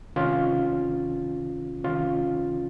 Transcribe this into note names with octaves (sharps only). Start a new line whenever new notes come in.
C3 D#3 C#4 F4
C3 D#3 C#4 F4